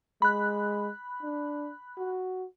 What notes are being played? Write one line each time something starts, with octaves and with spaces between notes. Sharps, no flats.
G#3 B5 F#6
D4
F#4